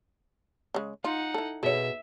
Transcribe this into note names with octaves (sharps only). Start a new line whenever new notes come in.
C#3 G#3
D#4 F4 F#5
E4 A4
B2 F#4 G#4 A4 C#5 E5